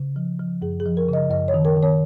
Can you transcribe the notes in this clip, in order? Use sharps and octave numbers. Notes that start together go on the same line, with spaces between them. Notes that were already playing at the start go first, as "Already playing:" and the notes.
Already playing: C#3
F3
F3
F#2 G#4
G#4
F3
A#4
C#3 D#5
F#2 D#5
C#5
D#3
A#4
D#3
C#5